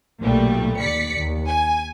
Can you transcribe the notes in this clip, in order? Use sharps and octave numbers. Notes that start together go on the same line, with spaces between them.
B1 A#2 G3 A3
D#2 D5 B6 C#7
D#2
G#5